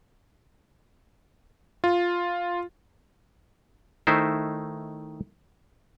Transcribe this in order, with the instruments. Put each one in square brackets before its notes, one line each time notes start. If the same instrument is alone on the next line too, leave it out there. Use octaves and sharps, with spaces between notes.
[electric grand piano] F4
[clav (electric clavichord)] D#3 A3 D#4 E4 C5